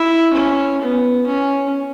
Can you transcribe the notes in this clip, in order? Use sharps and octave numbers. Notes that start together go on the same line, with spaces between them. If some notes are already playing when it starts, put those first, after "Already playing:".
Already playing: E4
C#4
B3
C#4